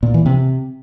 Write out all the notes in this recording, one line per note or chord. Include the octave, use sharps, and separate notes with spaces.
A#2
E3
C3